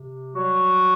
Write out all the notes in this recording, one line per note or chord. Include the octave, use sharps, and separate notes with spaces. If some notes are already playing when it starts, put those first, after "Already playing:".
Already playing: C3
F#3 G3 F#4